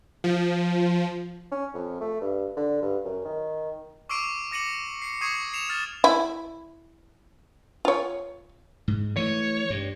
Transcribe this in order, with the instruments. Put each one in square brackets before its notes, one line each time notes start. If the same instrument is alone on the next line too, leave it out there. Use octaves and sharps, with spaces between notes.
[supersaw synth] F3
[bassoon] C#4
F2
A3
G2
D3
G2
F#2
D#3
[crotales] C#6 D6 E6 C7 D7 D#7
D6 A#6 C#7 D#7 F#7
C7 C#7
C#6 D#6 G#6 C7 C#7 D#7
C7 C#7 E7 F7
F6 A6 E7
[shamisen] E4
F4 C#5
[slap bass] G#2
[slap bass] E3 A3 [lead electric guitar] C#5
[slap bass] G2